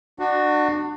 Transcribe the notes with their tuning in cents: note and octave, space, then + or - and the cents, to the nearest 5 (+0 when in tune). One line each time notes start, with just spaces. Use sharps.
D4 +30 F#4 +0